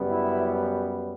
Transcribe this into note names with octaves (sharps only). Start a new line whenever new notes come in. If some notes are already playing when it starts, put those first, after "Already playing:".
Already playing: F#2 C#3 G3 B3
E4